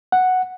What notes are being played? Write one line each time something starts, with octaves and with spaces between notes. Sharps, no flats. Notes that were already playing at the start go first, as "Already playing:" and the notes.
F#5